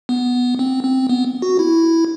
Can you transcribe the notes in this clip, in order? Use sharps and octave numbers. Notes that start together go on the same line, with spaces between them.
B3
C4
C4
B3
F#4
E4